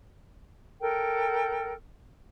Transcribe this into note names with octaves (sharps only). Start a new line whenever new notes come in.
A4 A#4 G5